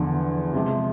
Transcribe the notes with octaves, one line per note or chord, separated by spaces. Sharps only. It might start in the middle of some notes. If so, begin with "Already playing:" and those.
Already playing: E2 D3 F3
C3 F3 G#3